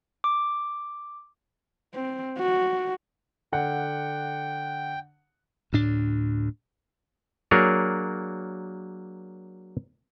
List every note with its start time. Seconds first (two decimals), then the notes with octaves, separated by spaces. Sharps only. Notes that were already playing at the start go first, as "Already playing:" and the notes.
0.24 D6
1.94 C4
2.39 F#4
3.53 D3 F#5 G5
5.73 D2 A2 D4
7.51 F#3 A#3 D4 G#4 A#4 C#5